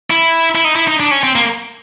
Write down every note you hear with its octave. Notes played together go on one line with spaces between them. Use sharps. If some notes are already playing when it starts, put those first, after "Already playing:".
E4
E4
D#4
E4
D#4
D4
C#4
C4
A#3